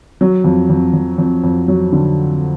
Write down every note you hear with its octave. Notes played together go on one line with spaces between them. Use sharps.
F#3
F2
F2
F2
F2
F2
F#3
D3